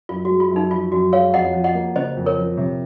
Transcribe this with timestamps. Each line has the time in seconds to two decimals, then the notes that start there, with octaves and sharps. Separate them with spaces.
0.09 F#2 F4
0.25 F#4
0.30 G#3
0.40 F4
0.51 F#2
0.56 D#4
0.71 F3 F4
0.92 F#2 F#4
1.13 G#3 C#5 F5
1.34 F2 D#5 F#5
1.54 F3
1.64 D#5 F#5
1.75 A#3
1.96 C#3 C5 D#5
2.16 F2
2.26 A#4 C#5
2.37 F3
2.57 C3